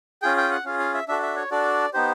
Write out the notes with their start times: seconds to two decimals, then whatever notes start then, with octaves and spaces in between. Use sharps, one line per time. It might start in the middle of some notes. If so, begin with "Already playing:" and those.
0.22 C#4 F4 G#4 G5
0.37 G5
0.51 F#5
0.65 C#4 F4 G#4 F5
0.79 F5
0.94 E5
1.08 D4 F#4 A4 E5
1.23 E5
1.36 C#5
1.51 D4 F#4 A4 D5
1.94 B3 D#4 G4 C5